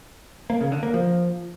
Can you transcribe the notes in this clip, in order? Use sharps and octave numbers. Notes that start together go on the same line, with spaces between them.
A#3
C#3
D3
A#3
F3